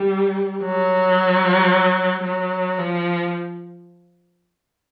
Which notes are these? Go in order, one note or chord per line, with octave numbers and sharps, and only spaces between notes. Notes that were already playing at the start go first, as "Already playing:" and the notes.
Already playing: G3
F#3
F#3
F3